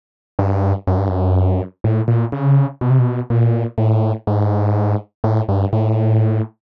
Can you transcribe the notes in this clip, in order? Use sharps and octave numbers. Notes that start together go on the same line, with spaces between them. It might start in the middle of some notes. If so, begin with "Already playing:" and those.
G2
F#2
G2
F#2
A2
A#2
C#3
B2
C3
B2
A#2
A2
G#2
A2
G2
A2